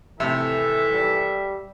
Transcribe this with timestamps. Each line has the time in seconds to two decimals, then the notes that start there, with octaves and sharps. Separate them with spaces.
0.20 G#1 A2 C3 E3 A4 E5
0.93 G3